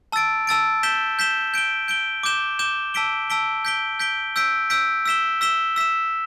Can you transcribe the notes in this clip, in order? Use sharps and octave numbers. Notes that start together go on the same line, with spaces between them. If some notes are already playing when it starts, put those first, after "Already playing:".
A5 E6 A6 D7
A5 E6 A6 D7
G6 B6 E7 G7
G6 B6 E7 G7
G6 D7 G7
G6 D7 G7
D6 G6 E7 G7
D6 G6 E7 G7
A5 E6 B6 D7 G7
A5 E6 B6 D7 G7
G6 B6 D7 G7
G6 B6 D7 G7
E6 G6 B6 D7
E6 G6 B6 D7
E6 B6 E7 G7
E6 B6 E7 G7
E6 B6 E7